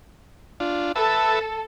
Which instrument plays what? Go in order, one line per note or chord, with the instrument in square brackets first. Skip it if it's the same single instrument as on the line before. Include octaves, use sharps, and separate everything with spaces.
[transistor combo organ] D4 F4
[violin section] A4 [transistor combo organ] B4 E5 A5